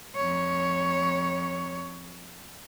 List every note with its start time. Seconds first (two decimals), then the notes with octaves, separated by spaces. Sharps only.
0.16 F2 C#5